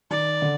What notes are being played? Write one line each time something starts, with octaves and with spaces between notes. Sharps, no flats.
D#3 D5
D3